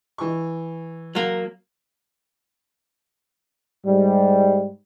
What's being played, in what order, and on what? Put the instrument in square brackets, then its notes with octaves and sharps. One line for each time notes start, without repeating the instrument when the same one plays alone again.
[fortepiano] E3 C#6
[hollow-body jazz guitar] F#3 A#3
[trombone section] G#2 G3